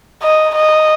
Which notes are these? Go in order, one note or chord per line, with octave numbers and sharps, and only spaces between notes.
D#5
D#5